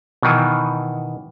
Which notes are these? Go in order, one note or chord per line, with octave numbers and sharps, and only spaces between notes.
B2 D#3 E3